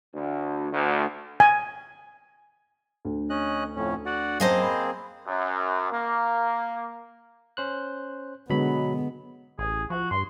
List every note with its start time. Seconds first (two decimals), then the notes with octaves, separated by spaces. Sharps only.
0.14 D2
0.72 D2
1.40 G#5
3.05 D2
3.30 C#4 D#5 F#6
3.76 F2 A2 C#4
4.06 F#4 D5 F#5
4.40 F#2 A#3 C4 G#4 C5 D#5 F5 A5
4.62 B5
5.27 F#2
5.91 A#3
7.57 C#4 C5 F#6
8.50 B2 D3 F#3 G#3 B3 B5
9.59 A1 G#4
9.90 F3 F#4
10.11 G2 C6